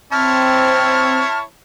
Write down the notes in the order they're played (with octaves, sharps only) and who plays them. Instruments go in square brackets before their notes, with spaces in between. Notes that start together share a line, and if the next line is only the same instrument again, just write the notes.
[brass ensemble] C4 [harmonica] E4 C#5 A5 [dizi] F6